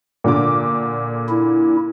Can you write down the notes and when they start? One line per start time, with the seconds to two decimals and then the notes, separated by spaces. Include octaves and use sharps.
0.24 A#2 D3 D6
1.29 E4